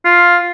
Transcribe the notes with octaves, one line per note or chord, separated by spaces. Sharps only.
F4